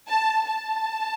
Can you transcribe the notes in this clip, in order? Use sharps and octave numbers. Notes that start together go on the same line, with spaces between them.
A5
A5